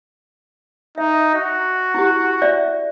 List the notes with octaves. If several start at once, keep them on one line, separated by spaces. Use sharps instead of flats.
D#4 E5
F#4
E4 G4
D5 E5